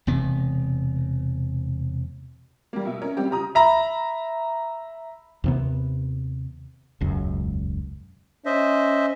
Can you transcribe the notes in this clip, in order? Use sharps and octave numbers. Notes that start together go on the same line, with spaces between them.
E1 C3 B3
G3 A#3
B2 E5
C#4 A#4
G3 C4 G4
C#3 G4 A#5 D#6
E5 A#5 B5
D#2 C3 B3
E1 C#2 F#2
C#4 C5 D#5 E5